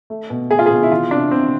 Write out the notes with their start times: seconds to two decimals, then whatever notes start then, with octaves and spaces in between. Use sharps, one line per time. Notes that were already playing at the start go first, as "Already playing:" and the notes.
0.10 A3
0.30 B2
0.51 A3 G#4
0.59 F4
0.66 B2 G#4
0.83 E4
0.91 E3 F4
1.11 C3 D4
1.31 C3 C4